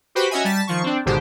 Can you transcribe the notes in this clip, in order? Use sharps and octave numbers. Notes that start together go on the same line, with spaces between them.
F#4 G4 B4 C5 B5
C#4 F#4 D#5 E5 G#5
G3 A5 A6 B6
D#3 F3 C#6
C4 D4
G#1 G#2 B2 D3 G4 C5